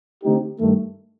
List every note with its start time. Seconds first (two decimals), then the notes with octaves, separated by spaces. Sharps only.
0.24 D3 A3 C4 D#4 G4
0.60 G2 D#3 A3